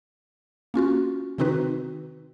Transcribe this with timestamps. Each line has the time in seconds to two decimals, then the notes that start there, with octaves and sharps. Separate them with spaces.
0.74 A#3 C#4 F4 F#4
1.38 C3 D#3 C4 D#4 F#4 B4